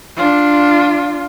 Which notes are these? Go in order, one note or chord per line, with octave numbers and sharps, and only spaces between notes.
D4 F4